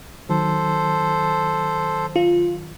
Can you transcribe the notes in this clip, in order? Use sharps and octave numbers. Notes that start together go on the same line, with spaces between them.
D#3 F#3 A4 C5
F4